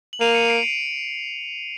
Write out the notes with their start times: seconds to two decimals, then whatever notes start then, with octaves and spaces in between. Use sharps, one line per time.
0.13 F#7
0.20 A#3 D#7 F7
0.35 C#7 D#7
0.49 C7 D7
0.63 C7 D7